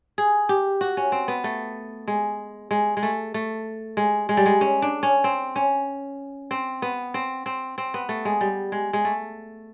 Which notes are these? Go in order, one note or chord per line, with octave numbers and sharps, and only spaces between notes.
G#4
G4
F#4
C#4
C4
B3
A3
G#3
G#3
G#3
A3
A3
G#3
G#3
G3
G#3
C#4
D4
C#4
C4
C#4
C4
B3
C4
C4
C4
B3
A3
G#3
G3
G#3
G#3
A3